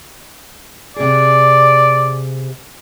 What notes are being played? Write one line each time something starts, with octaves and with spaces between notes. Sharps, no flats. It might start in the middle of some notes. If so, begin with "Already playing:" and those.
C3 G#4 D5